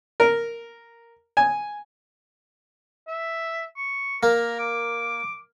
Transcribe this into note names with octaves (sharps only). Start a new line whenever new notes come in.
A#4
G#5
E5
C#6
A#3 A#4
D6